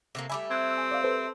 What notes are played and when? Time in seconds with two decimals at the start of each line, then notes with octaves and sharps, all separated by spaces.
0.15 C3 A3 A#3
0.30 G3 A3 E5 G#5 B5 D6
0.51 C4 E6 F#6 G#6
0.78 G#5
0.91 D5 F5
1.04 A4 B4 C5